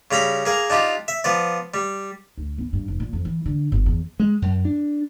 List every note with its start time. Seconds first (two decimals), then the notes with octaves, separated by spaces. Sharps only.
0.11 C#3 G3 A#5 B5
0.45 A#3 G#4 A#4
0.70 D4 D#4 F4 G4
1.08 E5
1.24 F3 B3 D5
1.74 G3
2.38 D2
2.58 B3
2.73 G2
2.88 F1
3.00 A#2
3.13 F2
3.25 E3
3.46 D3
3.72 G1
3.86 E2
4.20 G#3
4.42 F#2
4.65 D4